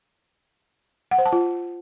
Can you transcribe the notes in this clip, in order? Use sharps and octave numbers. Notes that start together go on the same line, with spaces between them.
F#5
C5
A5
F4